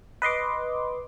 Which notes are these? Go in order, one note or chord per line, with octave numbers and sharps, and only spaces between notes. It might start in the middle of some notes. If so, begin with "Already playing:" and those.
B4 D#5 C6 D6